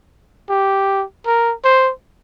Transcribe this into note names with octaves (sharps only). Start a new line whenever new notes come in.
G4
A#4
C5